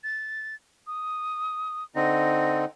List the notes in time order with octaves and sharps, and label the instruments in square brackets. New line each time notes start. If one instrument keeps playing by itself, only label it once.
[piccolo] A6
D#6
[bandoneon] D3 C4 D#4 [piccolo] A#6